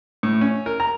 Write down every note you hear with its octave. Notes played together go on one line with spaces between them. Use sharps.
A2
C#4
A#4
A#5